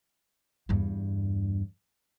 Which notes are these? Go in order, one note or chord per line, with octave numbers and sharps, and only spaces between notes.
E2 G2